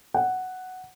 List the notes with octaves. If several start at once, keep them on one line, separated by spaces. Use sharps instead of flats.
F#5